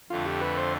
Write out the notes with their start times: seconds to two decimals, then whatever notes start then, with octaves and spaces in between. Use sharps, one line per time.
0.10 F2 D3 A3 D4 F4
0.26 G4
0.41 B4
0.57 C5